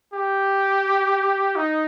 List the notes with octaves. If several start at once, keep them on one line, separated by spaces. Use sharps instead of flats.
G4
D#4